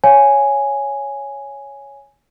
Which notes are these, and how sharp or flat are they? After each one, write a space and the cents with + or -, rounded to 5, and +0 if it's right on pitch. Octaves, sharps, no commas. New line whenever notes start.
C#5 +0 F5 +0 G#5 +0